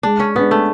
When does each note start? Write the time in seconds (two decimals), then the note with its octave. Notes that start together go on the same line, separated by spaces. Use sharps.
0.03 G#3 D4
0.20 C#4
0.35 B3 D4 G#4 B4
0.51 A3